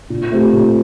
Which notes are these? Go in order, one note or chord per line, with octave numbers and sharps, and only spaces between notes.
A#2
A3 C4 G4
A#2